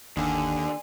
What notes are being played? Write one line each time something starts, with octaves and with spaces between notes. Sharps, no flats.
G1 D#2 D3 G#5